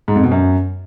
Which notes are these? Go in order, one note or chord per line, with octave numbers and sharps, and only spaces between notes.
G#2
F2
B2
F#2